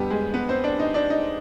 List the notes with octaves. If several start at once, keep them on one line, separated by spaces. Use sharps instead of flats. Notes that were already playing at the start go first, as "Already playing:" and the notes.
Already playing: F2 D3 G3 B3 G4
G#3 G#4
B3 B4
C4 C5
D4 D5
D#4 D#5
D4 D5
D#4 D#5